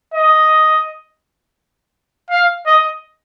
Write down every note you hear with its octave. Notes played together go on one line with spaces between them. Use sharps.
D#5
F5
D#5